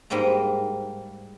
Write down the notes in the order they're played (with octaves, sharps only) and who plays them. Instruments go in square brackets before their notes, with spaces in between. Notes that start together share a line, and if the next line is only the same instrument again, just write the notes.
[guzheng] G#2 G3 A#3 D#5 A#5